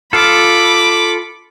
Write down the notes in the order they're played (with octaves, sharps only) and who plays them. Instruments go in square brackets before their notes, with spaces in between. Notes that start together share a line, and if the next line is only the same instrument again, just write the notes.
[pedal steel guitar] F4 A4 F5 [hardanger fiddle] B5 D6